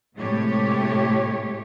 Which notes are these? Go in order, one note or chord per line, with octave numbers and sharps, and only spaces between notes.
A2 C3 G#3 A3 G4 C#5